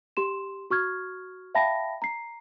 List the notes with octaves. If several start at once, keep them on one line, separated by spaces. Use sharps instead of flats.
G4 C6 E7
F#4 C#6 F6 G#6
E5 F5 G5 A5 B5 A#6
A#5 C7